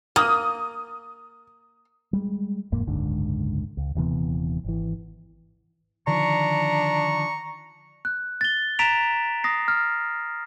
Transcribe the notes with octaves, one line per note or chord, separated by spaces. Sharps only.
A#3 D#6
G3 G#3
F1 E2 G#2 A#3
F#1 C#2 G#2 D3
C#2
D#1 C3 E3 B3
G#1 E3
D3 D#3 F3 D4 A#5 C#6
F#6
A6 G7
A#5 A6 B6 D7 E7 F7
D#6 A#6 C7
F6